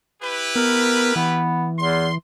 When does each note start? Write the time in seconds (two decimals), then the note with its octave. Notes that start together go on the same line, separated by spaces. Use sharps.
0.22 E4 G4 B4
0.56 B3 A#4
1.16 E3 B3
1.78 E2 C6